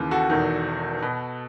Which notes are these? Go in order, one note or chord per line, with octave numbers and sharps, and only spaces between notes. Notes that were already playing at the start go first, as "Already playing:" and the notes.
Already playing: D#2 C#3 E3
F#4 A4
E1 E2 D#3
B2